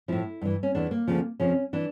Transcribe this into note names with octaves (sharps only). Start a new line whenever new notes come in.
A2 F3 E4
G2 E3
C#4
E2 E3 D4
A#3
D2 C#3 F3
F2 C#3 F3 C#4
E3 D4